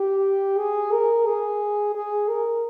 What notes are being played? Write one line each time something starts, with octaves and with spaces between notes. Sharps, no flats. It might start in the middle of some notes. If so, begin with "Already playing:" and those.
Already playing: G4
G#4
A#4
G#4
G#4
A#4